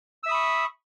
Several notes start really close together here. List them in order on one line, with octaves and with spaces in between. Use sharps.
E6 E5 D#6 B5 C#6